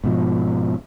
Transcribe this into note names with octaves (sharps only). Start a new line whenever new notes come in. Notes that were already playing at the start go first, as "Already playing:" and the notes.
G#2 B2 F3